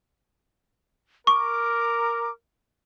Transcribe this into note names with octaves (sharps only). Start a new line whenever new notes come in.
A#4 C#6 D6